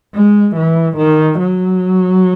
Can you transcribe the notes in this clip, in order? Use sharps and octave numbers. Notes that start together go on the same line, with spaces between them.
G#3
E3
D#3
F#3